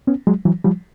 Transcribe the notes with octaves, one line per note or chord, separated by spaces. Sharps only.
B3 C#4
F#3 G#3
E3 F#3
F3 G3